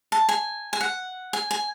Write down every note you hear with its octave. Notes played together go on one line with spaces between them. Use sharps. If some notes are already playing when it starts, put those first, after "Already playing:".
A5
G#5
G#5
F#5
G#5
G#5